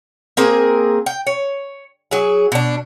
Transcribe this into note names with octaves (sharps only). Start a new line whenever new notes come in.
A#3 C4 G#4 A#4
G5
C#5
F#3 G#4
B2 D4